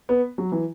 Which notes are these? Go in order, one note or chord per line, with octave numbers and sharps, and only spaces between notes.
B3
F#3
E3